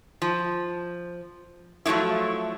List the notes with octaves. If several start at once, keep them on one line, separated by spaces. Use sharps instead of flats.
F3
F3 F#3 A3 D#4 E4